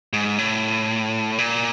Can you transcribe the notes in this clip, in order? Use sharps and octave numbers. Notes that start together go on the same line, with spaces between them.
G#2
A2
A#2